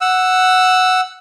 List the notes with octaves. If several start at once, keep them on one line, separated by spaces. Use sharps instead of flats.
F#5 E6